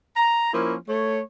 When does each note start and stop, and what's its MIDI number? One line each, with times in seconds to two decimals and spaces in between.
0.16 0.50 82
0.52 0.75 53
0.52 0.75 58
0.52 0.75 61
0.52 0.75 64
0.88 1.20 57
0.88 1.20 73